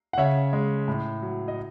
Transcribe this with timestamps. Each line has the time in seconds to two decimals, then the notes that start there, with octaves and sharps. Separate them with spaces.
0.13 F#5
0.17 C#3 C#5 E5
0.53 G#3
0.88 A2
1.22 F#3
1.48 D#5